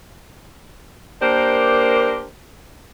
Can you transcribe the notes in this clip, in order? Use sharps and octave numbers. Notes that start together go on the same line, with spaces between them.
A#3 D4 G4 A#4 C5